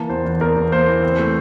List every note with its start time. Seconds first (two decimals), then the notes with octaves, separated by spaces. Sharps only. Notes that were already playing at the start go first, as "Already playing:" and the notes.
Already playing: E3 A#3 A5
0.09 E2 C5
0.25 E2
0.41 E2 A#4
0.56 E2
0.72 A#3 C5
0.88 E3
1.03 C4
1.19 A3